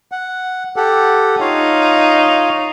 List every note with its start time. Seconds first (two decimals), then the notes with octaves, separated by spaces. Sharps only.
0.12 F#5
0.76 G4 A4 F#5
1.41 D#4 F4 C#5 F5